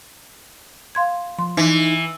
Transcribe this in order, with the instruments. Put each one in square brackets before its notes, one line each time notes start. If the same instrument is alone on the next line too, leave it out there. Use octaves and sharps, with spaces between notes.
[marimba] F5 C6 G#6
[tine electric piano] F3 [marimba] C6
[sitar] E3 [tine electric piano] D#4